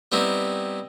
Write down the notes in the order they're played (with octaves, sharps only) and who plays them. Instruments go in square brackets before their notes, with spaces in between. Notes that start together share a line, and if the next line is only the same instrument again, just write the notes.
[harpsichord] G3 B3 C4 D#4 E4